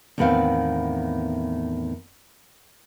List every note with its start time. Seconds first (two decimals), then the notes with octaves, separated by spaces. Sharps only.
0.18 E2 A2 D#3 B3 C4 F5